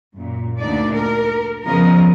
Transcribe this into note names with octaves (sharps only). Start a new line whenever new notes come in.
F#2 A#2
D2 A#2 D4 D#4 D5
A#4
F2 C#3 F3 B3 A#4 D#5